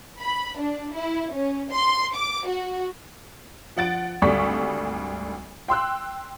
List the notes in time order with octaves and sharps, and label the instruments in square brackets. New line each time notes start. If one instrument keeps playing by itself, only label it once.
[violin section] B5
D4
E4
C#4
C6
D6
F#4
[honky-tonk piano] F3 F#5 A6 D7
G#1 D2 G3 A4 C#6 B6
G5 C6 E6 F#6